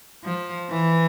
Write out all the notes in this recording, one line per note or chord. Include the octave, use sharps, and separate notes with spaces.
F3
E3